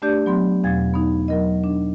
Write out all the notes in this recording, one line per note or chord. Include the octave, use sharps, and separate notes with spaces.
A3 D4 G4 D5 G6
F#3 B3 C6
E2 B2 F#3 F5 G#6 A6
B3 D#4
F#3 A#4 D#5
D4